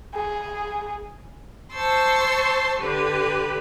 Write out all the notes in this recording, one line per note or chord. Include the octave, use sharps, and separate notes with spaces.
G#4
C5 A5 C6 C#6 E6
D3 G4 B4